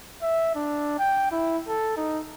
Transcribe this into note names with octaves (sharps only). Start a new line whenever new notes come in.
E5
D4
G5
E4
A4
D#4